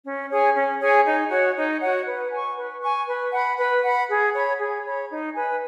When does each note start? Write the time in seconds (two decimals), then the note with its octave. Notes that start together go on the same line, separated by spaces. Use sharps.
0.04 C#4
0.29 G#4 C#5 G#5
0.54 C#4
0.80 G#4 C#5 G#5
1.05 D#4
1.30 F#4 C#5 F#5
1.55 D#4
1.80 F#4 C#5 F#5
2.06 B4
2.31 G#5 C#6
2.57 B4
2.82 G#5 C#6
3.07 B4
3.32 F#5 B5
3.58 B4
3.83 F#5 B5
4.08 G#4
4.33 C#5 B5
4.59 G#4
4.84 C#5 B5
5.09 D#4
5.35 B4 G#5